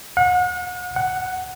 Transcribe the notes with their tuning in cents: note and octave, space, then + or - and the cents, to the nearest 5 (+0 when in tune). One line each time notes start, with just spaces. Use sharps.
F#5 -40
F#5 +0